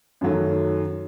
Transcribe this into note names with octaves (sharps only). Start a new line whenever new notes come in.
F#2 D#3 F#3 A3